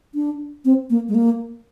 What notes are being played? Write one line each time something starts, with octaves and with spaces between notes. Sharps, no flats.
D4
C4
A#3
G#3
A#3